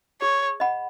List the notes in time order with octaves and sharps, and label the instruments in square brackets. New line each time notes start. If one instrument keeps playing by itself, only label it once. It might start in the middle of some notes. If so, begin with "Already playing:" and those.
[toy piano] G#4 [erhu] C#5
[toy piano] D#5 F#5 B5